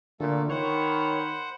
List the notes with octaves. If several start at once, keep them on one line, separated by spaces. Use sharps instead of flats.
A#2 D3 A3 A4
D#3 C5 C#5 F#5 B5